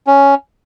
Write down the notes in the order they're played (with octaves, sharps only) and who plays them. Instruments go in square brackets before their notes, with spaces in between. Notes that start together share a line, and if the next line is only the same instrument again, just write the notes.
[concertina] C#4